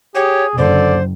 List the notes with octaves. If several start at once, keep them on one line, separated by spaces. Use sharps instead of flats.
G4 G#4 C#5
F#1 D3 C5 D5